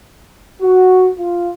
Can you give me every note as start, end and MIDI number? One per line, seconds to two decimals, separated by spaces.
0.62 1.10 66
1.19 1.51 65